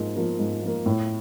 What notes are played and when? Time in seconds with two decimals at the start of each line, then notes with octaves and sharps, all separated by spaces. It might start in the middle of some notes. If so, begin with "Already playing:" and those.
Already playing: G#2 F3 A#3
0.16 F3 A#3
0.39 G#2
0.63 F3 A#3
0.86 A2